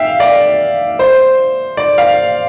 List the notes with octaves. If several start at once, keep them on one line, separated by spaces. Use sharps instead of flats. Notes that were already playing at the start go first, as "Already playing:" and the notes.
Already playing: E5 F5 G5
D5
C5
D5
F5